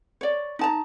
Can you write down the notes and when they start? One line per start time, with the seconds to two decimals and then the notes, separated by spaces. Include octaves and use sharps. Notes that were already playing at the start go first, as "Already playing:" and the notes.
0.21 C#5 D5
0.59 D#4 A5 A#5